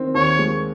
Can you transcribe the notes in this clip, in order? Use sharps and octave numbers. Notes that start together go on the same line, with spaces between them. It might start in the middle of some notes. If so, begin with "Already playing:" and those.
Already playing: D#3 C4
D#2 C#5
G#3